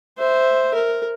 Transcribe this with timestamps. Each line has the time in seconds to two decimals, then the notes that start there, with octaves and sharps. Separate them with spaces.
0.18 C5 E5
0.74 A#4